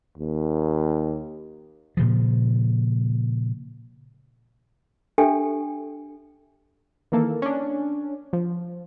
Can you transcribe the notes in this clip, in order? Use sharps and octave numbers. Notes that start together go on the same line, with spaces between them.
D#2
A#2 C#3 F3
D4 G4 A4 E5 G5 G#5
D#3 E3 A#3 A4
C#4 D4
F3